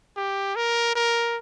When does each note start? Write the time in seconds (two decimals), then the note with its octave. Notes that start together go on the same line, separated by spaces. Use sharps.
0.16 G4
0.56 A#4
0.95 A#4